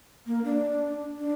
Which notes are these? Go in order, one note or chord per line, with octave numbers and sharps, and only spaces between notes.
A#3
D4
D4